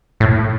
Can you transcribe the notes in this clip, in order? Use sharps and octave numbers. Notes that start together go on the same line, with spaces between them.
A2